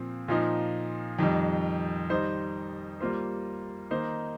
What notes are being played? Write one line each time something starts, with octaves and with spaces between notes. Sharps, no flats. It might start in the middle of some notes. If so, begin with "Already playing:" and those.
Already playing: A#2 F3 C4
A#2 F3 D#4
F2 D#3 G3
D#3 G3 D#4 C5
G3 A#3 F4 C5
D#3 A#3 D#4 C5